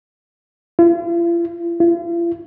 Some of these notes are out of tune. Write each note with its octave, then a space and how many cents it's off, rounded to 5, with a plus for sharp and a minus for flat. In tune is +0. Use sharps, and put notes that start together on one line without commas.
F4 -45
F4 -45